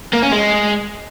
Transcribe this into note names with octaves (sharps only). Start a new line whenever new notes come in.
A#3
C#4
G#3